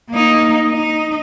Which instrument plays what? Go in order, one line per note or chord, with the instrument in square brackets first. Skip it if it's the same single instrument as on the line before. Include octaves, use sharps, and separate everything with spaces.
[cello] A#3 D#4
D#4